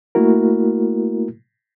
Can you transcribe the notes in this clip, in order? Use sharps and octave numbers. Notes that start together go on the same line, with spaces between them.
A3 A#3 E4 F#4 A#4